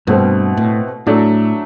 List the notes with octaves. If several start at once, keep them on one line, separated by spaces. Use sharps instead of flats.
G2 B2 A3 C4
A2
A2 F#3 A3 D4